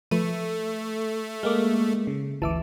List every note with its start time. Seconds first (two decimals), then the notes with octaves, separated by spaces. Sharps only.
0.11 F3 A3 B4 D#7
1.43 G#3 A#3 D6 F6
2.07 C#3
2.42 G#1 D2 E3 E5 A5 D6